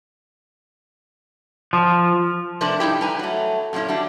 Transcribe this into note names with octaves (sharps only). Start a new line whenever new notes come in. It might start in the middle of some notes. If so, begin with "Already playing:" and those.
F3
C3 F3 A3 D4 A#4 B4
G2 D#4 E4 G4
G3 B4 G#5 A#5
F#3 A3
F#2 A#2 C4 C#4 E4
F#3 G3 D4